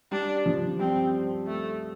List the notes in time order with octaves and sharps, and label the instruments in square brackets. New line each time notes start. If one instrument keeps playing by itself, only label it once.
[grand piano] G3 [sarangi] D4
[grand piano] F3
[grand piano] G3 [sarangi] C4
[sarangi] A3